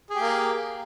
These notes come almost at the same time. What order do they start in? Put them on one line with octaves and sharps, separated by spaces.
G#4 G4 A#3